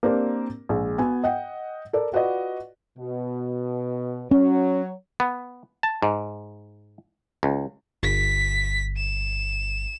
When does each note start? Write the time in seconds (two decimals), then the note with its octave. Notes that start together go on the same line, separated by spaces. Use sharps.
0.03 A#3 C4 D4 G4 A#4
0.69 A#1 G#3
0.98 B3 F#4 G#5
1.24 D#5 F#5 G5
1.93 A4 A#4 D5
2.13 F4 F#4 B4 D5 D#5
2.98 B2
4.31 F#3 C#4 C#5
5.20 B3
5.83 A5
6.02 G#2
7.43 C#2
8.03 G1 B6
8.97 E7